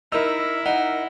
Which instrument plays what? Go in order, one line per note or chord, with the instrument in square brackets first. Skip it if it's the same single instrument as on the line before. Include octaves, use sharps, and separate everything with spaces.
[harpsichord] D#4 [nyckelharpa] E4 [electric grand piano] A#4 E6
[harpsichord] D#4 [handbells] F#5